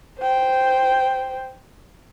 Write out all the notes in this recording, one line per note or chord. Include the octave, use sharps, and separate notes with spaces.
C5 G5